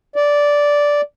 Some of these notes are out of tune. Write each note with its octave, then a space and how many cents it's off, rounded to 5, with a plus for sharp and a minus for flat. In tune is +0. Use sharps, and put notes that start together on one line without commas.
D5 -10